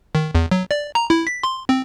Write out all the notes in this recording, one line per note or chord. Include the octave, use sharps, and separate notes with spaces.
D#3
E2
F#3
D5
A#5
E4
B6
C6
C4